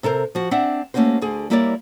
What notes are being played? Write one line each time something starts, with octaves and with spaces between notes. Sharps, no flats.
C3 A4 A#4 C5
F3 F#4
C4 D4 E5 F#5
A3 A#3 C4 C#4 F#4 C5
D2 D3 G#4
G3 A#3 E4 A#4 C#5 D5